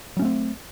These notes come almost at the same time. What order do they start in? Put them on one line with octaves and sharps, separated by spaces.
F#3 C#4 A3 C4